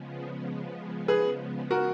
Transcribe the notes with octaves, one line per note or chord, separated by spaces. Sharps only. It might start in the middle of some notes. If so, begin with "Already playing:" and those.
Already playing: C#3 F3 G#3 B3
G#4 B4
F#4 A#4